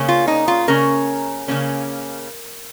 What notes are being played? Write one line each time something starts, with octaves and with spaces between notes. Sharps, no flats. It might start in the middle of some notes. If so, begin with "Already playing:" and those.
Already playing: C#3 A#3 C#4
F4
D#4
F4
C#3 A#3 C#4 A#4
C#3 A#3 C#4